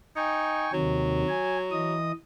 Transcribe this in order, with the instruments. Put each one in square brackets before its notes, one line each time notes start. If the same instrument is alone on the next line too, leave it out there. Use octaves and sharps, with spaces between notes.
[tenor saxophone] D#4 [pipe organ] G5 G#5 C#6
[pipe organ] D#2 C3 D#3 [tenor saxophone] F#3
[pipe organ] G#5
E3 D#5 D#6